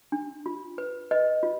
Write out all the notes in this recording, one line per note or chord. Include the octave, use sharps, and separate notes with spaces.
D4
F4
B4
B4 D#5
F4